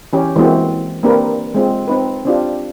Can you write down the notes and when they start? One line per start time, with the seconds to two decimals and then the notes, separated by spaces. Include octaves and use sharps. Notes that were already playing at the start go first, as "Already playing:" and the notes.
0.13 E3 C#4 G4
0.36 E3 G#3 A#3 C4 F#4
1.03 A#3 C4 D4 G4 A#4 B4
1.54 G#3 C4 F4
1.88 C4 D#4 B4
2.25 C4 D4 F4 G4